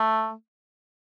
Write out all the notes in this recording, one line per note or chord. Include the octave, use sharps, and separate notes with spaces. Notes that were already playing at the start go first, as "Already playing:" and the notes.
Already playing: A3